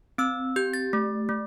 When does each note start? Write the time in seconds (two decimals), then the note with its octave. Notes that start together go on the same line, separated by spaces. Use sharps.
0.18 C4 E6
0.56 G4 G6
0.74 A6
0.93 A3
1.29 A3